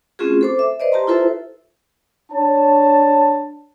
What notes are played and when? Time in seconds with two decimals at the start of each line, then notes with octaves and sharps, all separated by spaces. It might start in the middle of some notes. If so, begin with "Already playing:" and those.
0.19 A3 C4 C#4 F4 F#4 G#4
0.41 A4 C5 D6
0.59 E5
0.80 B4 C5 D5 D#5
0.92 G4 A5 A#5 C6
1.07 E4 F4 A4 B4 C5 E5
2.31 D4 C#5 A5